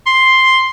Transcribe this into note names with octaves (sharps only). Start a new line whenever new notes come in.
C6